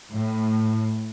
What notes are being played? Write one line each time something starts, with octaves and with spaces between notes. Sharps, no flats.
A2